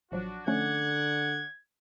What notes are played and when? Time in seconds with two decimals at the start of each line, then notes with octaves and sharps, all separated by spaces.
0.12 A1 F3 F#3 D4 F#4
0.47 D3 F3 A3 C#4 D5 F#5 G#6